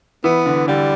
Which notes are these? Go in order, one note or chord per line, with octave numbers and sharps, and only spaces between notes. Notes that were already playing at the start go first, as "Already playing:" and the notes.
E3 B3
D3
D3 G3